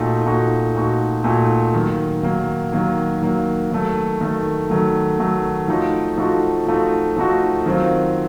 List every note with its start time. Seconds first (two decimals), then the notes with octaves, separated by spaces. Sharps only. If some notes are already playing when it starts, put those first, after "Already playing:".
Already playing: A#2 A3 D#4 F#4
0.25 A#2 A3 D#4 F#4
0.75 A#2 A3 D#4 F#4
1.24 A#2 A3 D#4 F#4
1.74 D#3 F#3 A#3
2.23 D#3 F#3 A#3
2.72 D#3 F#3 A#3
3.22 D#3 F#3 A#3
3.71 D#3 F#3 A3
4.21 D#3 F#3 A3
4.70 D#3 F#3 A3
5.19 D#3 F#3 A3
5.68 F3 A3 D#4 F#4
6.18 F3 A3 D#4 F#4
6.67 F3 A3 D#4 F#4
7.17 F3 A3 D#4 F#4
7.66 D#3 F#3 C4 F4